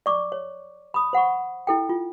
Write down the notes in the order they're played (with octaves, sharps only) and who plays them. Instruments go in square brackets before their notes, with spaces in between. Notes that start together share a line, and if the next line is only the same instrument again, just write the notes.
[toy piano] D5 C#6 D6
C#5
B5 D#6
C5 F#5 B5 C#6
E4 A4 G5
F4